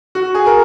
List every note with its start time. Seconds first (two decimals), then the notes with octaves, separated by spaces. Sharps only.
0.15 F#4
0.34 G#4
0.46 A#4